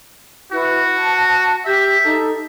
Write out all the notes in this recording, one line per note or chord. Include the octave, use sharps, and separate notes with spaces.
E4 F#4 B4
A5
G4 E5 G6
D#4 A4